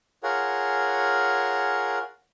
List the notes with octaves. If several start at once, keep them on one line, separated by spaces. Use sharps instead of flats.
F4 G#4 A#4 C#5 F#5